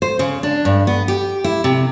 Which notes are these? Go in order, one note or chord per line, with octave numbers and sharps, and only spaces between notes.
C5
C#3
D4
G2
B3
G4
E4
C3